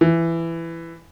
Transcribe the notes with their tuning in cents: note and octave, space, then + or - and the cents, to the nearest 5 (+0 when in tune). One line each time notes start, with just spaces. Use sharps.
E3 +15